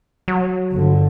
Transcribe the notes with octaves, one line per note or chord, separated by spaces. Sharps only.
F#3
G1 D3